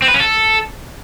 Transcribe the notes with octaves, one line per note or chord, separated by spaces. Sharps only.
C4
B4
C#4
A4